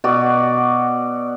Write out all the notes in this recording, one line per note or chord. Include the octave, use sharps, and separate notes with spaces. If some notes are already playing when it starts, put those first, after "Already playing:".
B2 F#4 D5